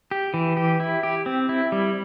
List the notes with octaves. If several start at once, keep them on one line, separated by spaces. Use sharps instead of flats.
G4
E3
G4
E4
G4
C4
E4
G3